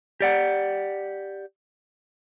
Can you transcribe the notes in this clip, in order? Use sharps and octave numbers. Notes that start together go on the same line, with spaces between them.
G4 D5 F#5